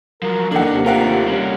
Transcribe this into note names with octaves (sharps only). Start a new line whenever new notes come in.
F3 F#3 A#4
D#2 D#3 A#3 D4 D#4 A4 F#5
D#2 C3
A3 F4 A#4 F5 F#5
G3 C#4